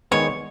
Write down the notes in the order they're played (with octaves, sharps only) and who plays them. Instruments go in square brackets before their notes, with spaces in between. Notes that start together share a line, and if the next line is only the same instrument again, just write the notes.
[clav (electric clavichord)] D#3 G#3 B3 [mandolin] C#5